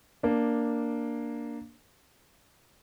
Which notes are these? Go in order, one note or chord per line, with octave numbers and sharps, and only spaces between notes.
A#3 D4